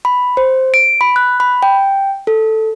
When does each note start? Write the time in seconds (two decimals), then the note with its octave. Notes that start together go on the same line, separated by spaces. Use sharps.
0.05 B5
0.37 C5
0.74 D7
1.01 B5
1.16 F#6
1.40 B5
1.63 G5
2.27 A4